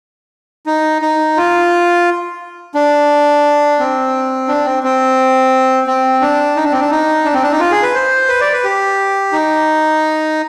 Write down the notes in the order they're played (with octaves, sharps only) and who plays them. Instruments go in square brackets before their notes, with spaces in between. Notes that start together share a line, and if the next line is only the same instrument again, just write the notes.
[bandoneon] D#4
D#4
F4
D4
C4
D4
C4
C4
C4
D4
D#4
D4
C4
D4
D#4
D4
C4
D4
D#4
F4
G#4
B4
C5
B4
D5
B4
G4
D#4